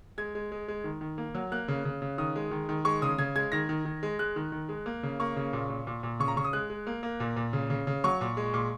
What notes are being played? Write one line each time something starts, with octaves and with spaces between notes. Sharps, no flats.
G#3 G#6
G#3
G#3
G#3
D#3
D#3
A#3
F#3
A#3 F#6
C#3
C#3
C#3
D#3 D#6
G#3
D#3
D#3
G#3 C#6
C#3 D#6
C#3 G#6
G#3 G#6
D#3 A#6
D#3
D#3
G#3
G#3 F#6
D#3
D#3
G#3
A#3
C#3
A#3 C#6
C#3
A#2
A#2
A#2
A#2
C#3 C#6
A#5
C#3 C#6
D#6
G#3 F#6
G#3
A#3
A#3
A#2
A#2
C#3
C#3
C#3
F#3 C#6
A#2
G#3
A#2